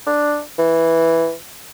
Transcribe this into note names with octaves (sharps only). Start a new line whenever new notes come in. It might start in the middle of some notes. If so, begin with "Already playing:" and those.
D4
E3